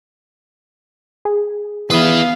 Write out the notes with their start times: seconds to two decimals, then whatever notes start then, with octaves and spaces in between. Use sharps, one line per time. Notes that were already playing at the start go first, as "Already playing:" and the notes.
1.25 G#4
1.90 E2 B3 B4 E5 F5 C6 D#6